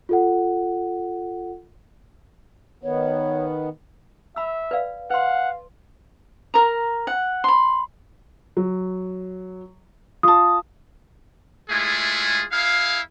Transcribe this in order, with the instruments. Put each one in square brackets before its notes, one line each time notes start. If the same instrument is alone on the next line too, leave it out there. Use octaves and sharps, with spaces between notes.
[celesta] F4 A4 F#5
[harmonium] D#3 B3 [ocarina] C#5
[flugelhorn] E5 [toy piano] B5 E6
[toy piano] B4 D5 F5
[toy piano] B4 C6 [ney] F5 [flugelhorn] F#5
[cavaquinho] A#4 A#5
F#5
B5 C6
[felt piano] F#3
[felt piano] F4 A5 [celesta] D#6
[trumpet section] G#3 A3 E4 F4 G#4
E4 G#4 F5